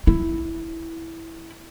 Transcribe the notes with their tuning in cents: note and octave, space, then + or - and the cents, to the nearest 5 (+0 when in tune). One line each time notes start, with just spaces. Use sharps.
E4 -5